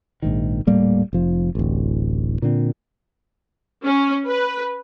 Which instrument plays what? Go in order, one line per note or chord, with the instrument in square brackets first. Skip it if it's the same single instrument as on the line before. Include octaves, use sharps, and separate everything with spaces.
[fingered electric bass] A#1 G#2 D#3
D#1 A2 G3 A#3
F1 F3
D1 A1
A#2 D3 C4
[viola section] C#4
B4